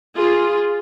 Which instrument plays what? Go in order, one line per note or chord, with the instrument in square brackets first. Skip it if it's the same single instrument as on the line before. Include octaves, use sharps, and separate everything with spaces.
[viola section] F4 G#4